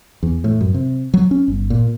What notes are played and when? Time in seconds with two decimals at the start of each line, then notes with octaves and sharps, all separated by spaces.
0.23 E2
0.44 A2
0.61 F#2
0.74 C3
1.14 F#3
1.31 C#4
1.48 G1
1.70 A#2